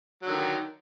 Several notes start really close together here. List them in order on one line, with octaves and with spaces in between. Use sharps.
F#3 D3 D#3